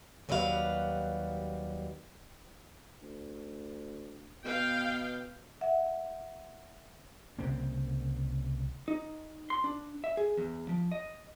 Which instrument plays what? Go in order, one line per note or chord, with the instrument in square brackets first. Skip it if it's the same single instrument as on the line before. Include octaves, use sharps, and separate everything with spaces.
[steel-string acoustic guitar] D#2 F#3 G3 B4 C5 F5
[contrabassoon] D2
[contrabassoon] B2 [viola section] B3 F5 G5
[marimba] E5 F#5
[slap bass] C2 C#3 A#3 C4
[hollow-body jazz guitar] D#4
C6
D4
E5
G#4
E2
F3
D#5